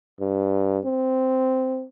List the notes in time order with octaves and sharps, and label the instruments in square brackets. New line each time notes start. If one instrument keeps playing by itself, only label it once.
[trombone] G2
C4